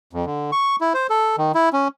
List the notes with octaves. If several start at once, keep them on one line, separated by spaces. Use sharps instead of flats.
F2
D3
C#6
E4
C5
A4
D#3
E4
C#4